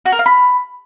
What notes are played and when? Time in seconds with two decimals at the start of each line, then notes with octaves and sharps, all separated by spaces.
0.06 F#4
0.12 A#4
0.19 F5
0.26 B5